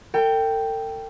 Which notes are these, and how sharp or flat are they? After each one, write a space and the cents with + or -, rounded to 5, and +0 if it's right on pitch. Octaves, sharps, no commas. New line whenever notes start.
A4 +45 G5 +0